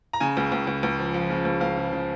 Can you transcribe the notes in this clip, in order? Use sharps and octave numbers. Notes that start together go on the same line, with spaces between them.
A#5
C#3 G#5
C#2
C#2
C#2
C#2
F3
F3
C#3
C#2
C#2 F5
C#3
C#3